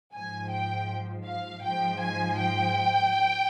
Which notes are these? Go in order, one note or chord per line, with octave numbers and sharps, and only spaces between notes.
G#2 F3 G#5
G5
F5
G#2 F3 G5
G#5
G5